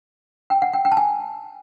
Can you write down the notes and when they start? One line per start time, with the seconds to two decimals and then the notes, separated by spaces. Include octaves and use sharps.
0.50 G5
0.62 F#5
0.73 G5
0.85 G5
0.92 A5
0.97 G#5